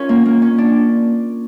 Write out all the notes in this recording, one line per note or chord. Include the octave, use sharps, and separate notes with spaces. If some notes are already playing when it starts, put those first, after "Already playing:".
Already playing: C#4 F4 A#4 C#5
A#3
A#3
C#4
D4